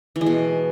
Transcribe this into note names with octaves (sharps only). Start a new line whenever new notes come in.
E3
G#3
B2